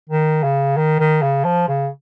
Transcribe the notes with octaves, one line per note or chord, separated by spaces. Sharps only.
D#3
C#3
D#3
D#3
C#3
F3
C#3